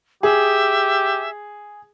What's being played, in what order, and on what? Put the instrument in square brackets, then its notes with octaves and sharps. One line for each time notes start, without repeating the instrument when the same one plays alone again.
[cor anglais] G4 [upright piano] G#4 [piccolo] E5